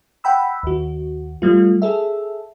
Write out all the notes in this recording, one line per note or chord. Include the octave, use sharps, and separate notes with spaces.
F#5 G5 B5 E6
D#2 F#4
G3 A3 F4
G#4 A4 E5